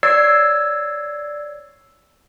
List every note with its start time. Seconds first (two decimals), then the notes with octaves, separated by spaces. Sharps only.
0.03 C#5 D5 E6 G#6 C7